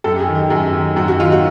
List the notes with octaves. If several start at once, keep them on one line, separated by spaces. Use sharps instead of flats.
F#2 A4
G4
G#4
D#3
G4
F#2 G#4
D#3
F#2 F#4
F#4
D#3 F4
F#4